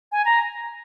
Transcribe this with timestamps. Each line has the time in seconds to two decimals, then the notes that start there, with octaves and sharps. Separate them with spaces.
0.12 G#5
0.25 A#5